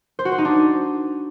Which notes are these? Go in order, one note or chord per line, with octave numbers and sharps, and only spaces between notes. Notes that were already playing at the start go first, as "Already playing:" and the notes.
C5
F#4
C5
D#4
D4